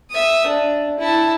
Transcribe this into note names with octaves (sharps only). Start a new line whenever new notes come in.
E5 D#6
D4
E4 A5